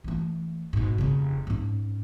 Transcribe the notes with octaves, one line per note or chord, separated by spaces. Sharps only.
E3 A3
G#2 B2
F1 C#3
G#2 C#4